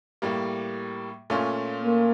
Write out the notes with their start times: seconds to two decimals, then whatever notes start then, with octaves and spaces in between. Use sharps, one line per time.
0.22 A2 G3 A#3
1.30 A#2 A3 C#4 F4
1.83 A#3